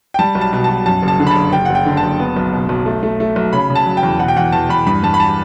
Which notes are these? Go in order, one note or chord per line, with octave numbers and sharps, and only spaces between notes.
G5
G3 A5
B1
A5
B2
B2 A5
F#2 A5
F#1
A5
D3
B5
F#1 A5
F#1 G5
F#1 F#5
G5
D3
A5
F#1
B3
B1
B2
B1
A3
A3
A3
B1
C#3 B5
C#3
A5
F#3
G5
E2
B2 F#5
G5
E2 F#5
E2 A5
E2 B5
G2 B5
G2 A5
B5
A5